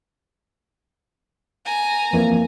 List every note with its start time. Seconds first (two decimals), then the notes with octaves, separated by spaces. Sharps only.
1.65 G#5 A#5
2.13 F2 E3 A#3